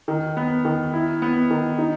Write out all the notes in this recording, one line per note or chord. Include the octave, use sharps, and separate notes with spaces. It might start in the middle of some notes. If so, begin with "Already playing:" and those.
D#3
B3
D#3
E4
B3
D#3
D#4